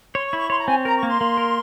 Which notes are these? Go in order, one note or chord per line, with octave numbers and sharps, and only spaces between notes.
C#5 C6
C#6
E4
C#6
C#5 C6
A#5
C4 G#5
A#4 A#5
C#6
A#3
C6
A#3
A#4